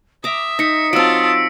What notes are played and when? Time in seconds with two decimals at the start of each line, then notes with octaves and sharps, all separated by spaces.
0.24 E5 A#5 D6 D#6
0.59 D#4 A#6 B6 C#7
0.93 F#3 C4 F4 A5 E6 D7